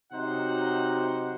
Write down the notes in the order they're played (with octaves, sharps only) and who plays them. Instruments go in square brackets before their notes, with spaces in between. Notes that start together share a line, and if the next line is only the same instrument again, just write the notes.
[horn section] C3 F#3 D#4 C5 F#5